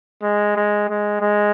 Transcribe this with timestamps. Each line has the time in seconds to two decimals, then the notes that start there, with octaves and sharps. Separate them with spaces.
0.22 G#3
0.56 G#3
0.89 G#3
1.21 G#3